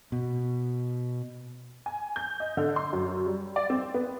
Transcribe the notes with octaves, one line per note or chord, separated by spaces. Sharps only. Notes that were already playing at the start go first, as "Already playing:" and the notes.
B2
G#5
G6
D#5
D3
C6
F#2
G3
D5
C4
B3